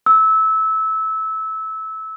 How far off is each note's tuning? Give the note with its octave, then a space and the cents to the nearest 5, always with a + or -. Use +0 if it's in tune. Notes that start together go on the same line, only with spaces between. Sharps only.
E6 -20